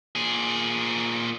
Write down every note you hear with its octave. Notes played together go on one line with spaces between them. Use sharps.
A#2 G#4